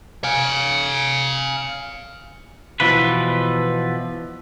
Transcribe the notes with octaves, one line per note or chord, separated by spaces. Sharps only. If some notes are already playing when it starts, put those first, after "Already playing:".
F5 G#5
B2 E3 F3 B4